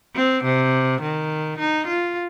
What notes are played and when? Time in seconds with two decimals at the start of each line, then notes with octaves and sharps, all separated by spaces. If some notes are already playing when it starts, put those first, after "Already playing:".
0.15 C4
0.44 C3
1.01 D#3
1.59 D#4
1.87 F4